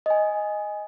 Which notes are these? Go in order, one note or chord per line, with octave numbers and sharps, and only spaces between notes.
D#5 G#5